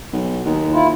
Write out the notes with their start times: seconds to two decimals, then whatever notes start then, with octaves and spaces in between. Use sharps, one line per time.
0.13 B1
0.46 D#2
0.72 E4 F4